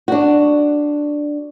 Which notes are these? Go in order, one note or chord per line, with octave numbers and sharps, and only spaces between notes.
D4 F#4